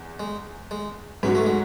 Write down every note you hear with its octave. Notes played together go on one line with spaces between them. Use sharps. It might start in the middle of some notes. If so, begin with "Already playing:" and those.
Already playing: E2
G#3
G#3
G#2 F#3 B3 C#4 F#4
A3
G#3